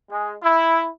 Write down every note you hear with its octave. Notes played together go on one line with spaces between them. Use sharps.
G#3
E4